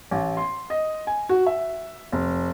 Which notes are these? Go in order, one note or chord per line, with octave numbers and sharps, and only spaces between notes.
A1
C6
D#5
G#5
F#4
E5
F1